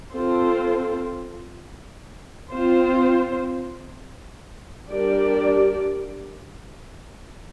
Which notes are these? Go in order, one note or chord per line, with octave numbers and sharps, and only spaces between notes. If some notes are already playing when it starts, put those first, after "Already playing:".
C4 F4 A4 C5
C4 F4 C5
G3 D4 G4 A#4 D5